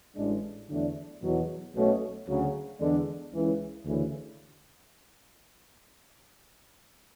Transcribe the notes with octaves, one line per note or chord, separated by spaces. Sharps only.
A1 A2 G#3 D4
E2 D3 F#3 A3 D4
E2 B2 F#3
B1 B2 A3 C#4
D2 C#3 F#3
E2 D3 G#3 D4
C#2 C#3 E3
D2 C#3 E3